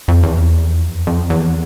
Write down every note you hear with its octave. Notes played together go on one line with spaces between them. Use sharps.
F2
E2
F2
F2
E2